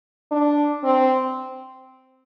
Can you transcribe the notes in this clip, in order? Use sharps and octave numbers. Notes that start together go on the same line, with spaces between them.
D4
C4